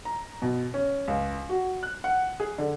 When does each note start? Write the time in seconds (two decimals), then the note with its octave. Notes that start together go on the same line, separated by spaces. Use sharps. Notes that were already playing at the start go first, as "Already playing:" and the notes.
0.05 A#5
0.42 B2
0.74 C#4
1.08 C#2
1.49 F#4
1.83 F#6
2.04 F#5
2.40 G#4
2.58 D3